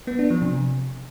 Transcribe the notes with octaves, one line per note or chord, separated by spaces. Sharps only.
B3
D4
F3
C3